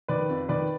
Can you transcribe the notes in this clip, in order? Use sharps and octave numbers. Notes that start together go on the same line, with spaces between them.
D#3 B4 D5
F2
D#3 B4 D5